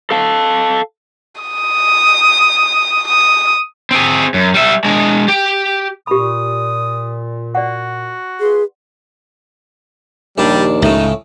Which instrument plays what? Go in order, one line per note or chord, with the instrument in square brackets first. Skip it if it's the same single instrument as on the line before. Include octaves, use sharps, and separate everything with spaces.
[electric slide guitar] A4 F5 A5
[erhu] D#6
D#6
[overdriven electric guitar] C4 G#4
F#2
G3 E5
G#3 D4
G4
[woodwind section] A#2 [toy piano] G4 B5 [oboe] D#6
[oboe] F#4 [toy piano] D5 F#5
[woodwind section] F4 B4 C6 [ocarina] G#4
[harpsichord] A#1 D4 [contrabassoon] D#2 [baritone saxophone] G3
[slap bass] C#2 [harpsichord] A2 C#3 [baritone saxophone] D#4